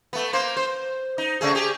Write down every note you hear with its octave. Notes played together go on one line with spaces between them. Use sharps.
A3 B3
A#3 C5
C5
D#4
C#3 A3 G#4
G4 G#4